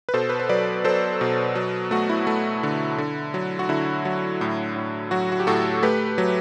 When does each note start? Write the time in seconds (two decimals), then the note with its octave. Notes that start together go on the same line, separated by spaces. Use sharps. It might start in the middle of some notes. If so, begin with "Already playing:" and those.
0.09 B4
0.13 B2 A4 C5
0.29 B4
0.40 C5
0.49 F#3 B4 D5
0.84 F#3 A4 C5
1.21 B2
1.55 F#3
1.91 A3 F#4
2.09 E4
2.27 A3
2.63 D3
2.98 D3
3.34 F#3
3.59 F#4
3.69 D3 E4
4.05 F#3
4.41 A2
4.76 A2
5.11 F#3 F#4
5.32 F#4
5.40 G4
5.47 A2 F#4 A4
5.83 A3 G4 B4
6.18 F#3